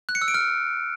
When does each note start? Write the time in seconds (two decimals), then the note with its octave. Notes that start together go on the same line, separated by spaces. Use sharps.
0.09 F#6
0.15 C#7
0.22 E6
0.28 D7
0.34 F6